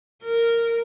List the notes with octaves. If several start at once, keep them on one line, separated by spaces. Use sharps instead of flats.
A#4